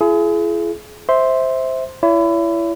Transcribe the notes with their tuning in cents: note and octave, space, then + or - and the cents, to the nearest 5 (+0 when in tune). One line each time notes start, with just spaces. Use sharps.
E4 +45 G#4 +30
C5 +0 E5 -15 C6 +0
E4 +25 C#5 +45